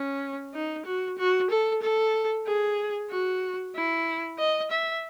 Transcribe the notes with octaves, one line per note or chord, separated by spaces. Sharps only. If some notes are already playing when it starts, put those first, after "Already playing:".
Already playing: C#4
D#4
F#4
F#4
A4
A4
G#4
F#4
E4
D#5
E5